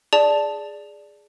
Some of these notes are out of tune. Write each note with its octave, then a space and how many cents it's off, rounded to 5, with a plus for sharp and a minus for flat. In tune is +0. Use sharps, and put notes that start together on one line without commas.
G#4 +0 D5 +0 A5 +0